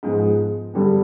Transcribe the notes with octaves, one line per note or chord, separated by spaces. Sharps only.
G#2 F3 G#3 B3
G2 D3 G3 B3